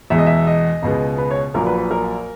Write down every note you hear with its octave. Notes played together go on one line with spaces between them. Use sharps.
E2 B2 G#3 E5
D#5
E5
D#5
C#2 B2 G#3 B3
B4
C#5
A#1 A#2 F#3 A#3 A#4
B4
B4
A#4